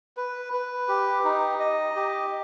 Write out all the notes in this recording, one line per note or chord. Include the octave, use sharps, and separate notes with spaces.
B4
B4
G4
D#4
D#5
G4